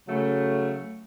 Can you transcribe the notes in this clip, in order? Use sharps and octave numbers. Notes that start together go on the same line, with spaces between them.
C#3 F#3 A3